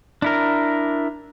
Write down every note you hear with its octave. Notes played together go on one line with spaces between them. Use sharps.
D4 E4 A#4